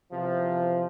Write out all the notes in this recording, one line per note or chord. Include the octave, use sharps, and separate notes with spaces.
E2 C3 F3